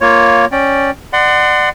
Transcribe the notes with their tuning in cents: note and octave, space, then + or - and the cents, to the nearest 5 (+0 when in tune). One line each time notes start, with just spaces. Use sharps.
A#3 +0 F4 +0 C#5 +0
C#4 +0 D5 +0 G5 +0
D5 +30 F#5 +10 C6 -20